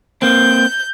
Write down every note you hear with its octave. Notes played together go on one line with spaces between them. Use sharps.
A#3 C4 G6